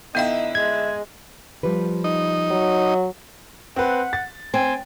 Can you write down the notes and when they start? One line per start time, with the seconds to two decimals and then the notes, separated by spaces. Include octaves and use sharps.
0.15 D3 B3 D#4 E4 F5 G5
0.55 G#3 G#6
1.63 F3 G3 B4
2.04 D#4
2.51 F#3
3.76 C4 B4 F#5
4.13 A6
4.54 C4 G#5